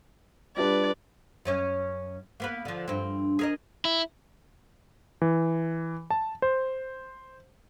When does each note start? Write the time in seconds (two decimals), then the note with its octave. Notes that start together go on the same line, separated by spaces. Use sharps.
0.57 G3 D4 F4 G4 B4 D5
1.45 F#2 C#4 C#5
2.40 A#3 B3 B4
2.65 D3 F3
2.88 G2 C4
3.39 G#4 A#4 D#5
3.85 E4
5.21 E3
6.10 A5
6.42 C5